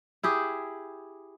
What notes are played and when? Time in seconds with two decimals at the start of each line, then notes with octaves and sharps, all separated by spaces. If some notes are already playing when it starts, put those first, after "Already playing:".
0.23 E4 G4 G#4